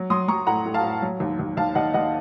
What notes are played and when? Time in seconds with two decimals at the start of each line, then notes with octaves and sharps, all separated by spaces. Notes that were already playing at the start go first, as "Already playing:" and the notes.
Already playing: F#3
0.10 F#3 C6 D#6
0.28 F#3 A#5 C#6
0.47 A2 F#5 A#5
0.65 A2
0.74 F5 A5
0.84 A2
1.02 F#3
1.20 D#2
1.39 D#2
1.57 D#2 F5 A5
1.75 D#2 D#5 F#5
1.94 D#2 D#5 F#5